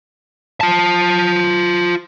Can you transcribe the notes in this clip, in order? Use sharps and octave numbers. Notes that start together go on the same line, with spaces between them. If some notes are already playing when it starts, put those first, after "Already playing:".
F4 A5